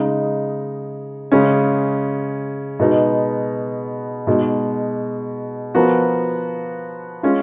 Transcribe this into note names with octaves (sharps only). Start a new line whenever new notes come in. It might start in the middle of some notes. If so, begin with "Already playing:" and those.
Already playing: C#3 G#3 D#4
C#3 G#3 C#4
B2 G#3 B3 D#4
B2 G#3 D#4
F3 B3 F#4 A#4
G#3 C#4 F4